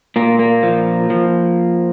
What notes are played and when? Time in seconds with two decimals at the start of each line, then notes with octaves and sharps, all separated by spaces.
0.16 A#2 A#3
0.39 A#3
0.63 F3
1.10 F3